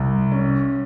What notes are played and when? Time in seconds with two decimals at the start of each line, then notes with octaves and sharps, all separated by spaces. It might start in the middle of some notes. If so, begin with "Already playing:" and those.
Already playing: C2
0.32 C#4